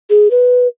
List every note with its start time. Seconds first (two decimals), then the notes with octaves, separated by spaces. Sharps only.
0.10 G#4
0.31 B4